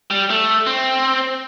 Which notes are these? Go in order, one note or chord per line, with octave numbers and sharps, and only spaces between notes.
G3
A3
C4